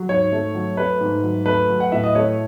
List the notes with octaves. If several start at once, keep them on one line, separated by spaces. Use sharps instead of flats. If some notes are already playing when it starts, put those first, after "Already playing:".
Already playing: F#3
G#2 C#5
A3
F#3
A3 B4
G#2
F#3
A3 B4
F#3
F#5
A2 E5
D#5
A3 C#5